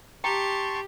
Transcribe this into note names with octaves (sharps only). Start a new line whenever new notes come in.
G4 G5 A5 A#5 C6 C#6